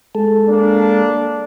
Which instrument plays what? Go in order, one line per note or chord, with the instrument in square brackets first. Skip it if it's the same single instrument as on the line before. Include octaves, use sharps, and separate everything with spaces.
[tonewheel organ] G#3 A4
[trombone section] A#3 D4